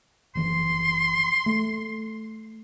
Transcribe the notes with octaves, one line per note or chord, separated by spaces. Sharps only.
F#1 E3 F3 C6
A3